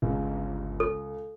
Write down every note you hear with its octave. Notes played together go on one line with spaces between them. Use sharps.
G1 C#2
A4